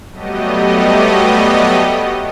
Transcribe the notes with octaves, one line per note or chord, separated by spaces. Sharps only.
F#3 G3 A3 B3 G4 D#5